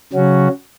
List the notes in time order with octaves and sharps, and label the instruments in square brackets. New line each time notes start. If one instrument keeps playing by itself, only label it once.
[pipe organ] C#3 F#3 C#4 F#4